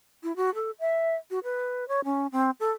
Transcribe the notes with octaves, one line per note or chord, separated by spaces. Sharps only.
E4
F#4
A4
E5
F#4
B4
C#5
C#4
C4
A4